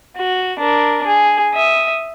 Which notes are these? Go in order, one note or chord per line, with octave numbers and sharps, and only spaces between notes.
F#4
D4 A#4
G#4
E5 D#6